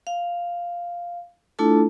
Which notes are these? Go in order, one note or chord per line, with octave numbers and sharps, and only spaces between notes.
F5
A3 D4 E4 F4 A4 A5